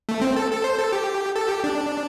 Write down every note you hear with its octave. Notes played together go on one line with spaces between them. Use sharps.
A3
C4
A4
A4
C5
A4
G4
A4
G4
D4